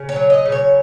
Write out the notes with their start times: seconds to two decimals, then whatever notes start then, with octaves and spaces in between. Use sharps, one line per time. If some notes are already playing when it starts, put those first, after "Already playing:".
Already playing: C#3
0.09 C#5
0.16 F#3
0.30 D#5
0.46 C#3
0.52 C#5